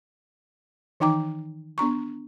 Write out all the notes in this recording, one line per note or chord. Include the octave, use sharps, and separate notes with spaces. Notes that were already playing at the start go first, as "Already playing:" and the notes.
D#3 E3 D#4 G5 A#5 D6
B3 D4 A#5 C#6